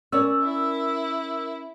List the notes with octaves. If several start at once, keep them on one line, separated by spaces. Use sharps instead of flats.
C#4 A#4 D5 E6
E4